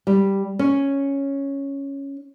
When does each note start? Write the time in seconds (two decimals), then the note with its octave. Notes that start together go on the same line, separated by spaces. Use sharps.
0.07 G3
0.59 C#4